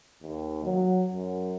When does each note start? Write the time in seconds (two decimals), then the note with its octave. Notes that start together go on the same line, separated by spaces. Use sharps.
0.22 D#2
0.64 F#3
1.12 F#2